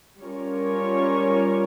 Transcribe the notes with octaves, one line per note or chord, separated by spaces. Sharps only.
G3 C#4 F4 A#4 C#5